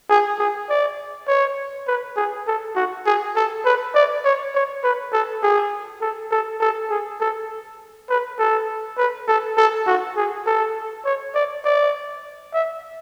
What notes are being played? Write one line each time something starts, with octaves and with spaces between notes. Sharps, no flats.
G#4
G#4
D5
C#5
B4
G#4
A4
F#4
G#4
A4
B4
D5
C#5
C#5
B4
A4
G#4
A4
A4
A4
G#4
A4
B4
A4
B4
A4
A4
F#4
G#4
A4
C#5
D5
D5
E5